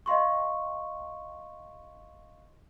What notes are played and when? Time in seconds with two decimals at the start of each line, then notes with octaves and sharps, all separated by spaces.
0.06 D#5 F5 C6 C#6